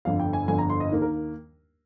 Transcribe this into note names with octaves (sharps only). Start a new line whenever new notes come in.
G1 F2 D3 F5
G5
G#5
G1 F2 D3 G#5
A#5
C6
D#5
D#2 D#3 A#3
A#4